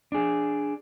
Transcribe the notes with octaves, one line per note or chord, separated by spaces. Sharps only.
D4 G#4